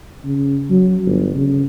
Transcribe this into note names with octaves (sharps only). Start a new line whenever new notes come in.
C#3
F#3
G1
C#3